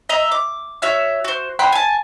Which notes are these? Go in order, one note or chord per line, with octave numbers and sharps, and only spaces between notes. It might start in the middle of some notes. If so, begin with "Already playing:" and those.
D#5 E5 A#5
D6
F#4 C#5 E5 F6
F#4 C5
F#5 G5 B5 C6
G#5 A5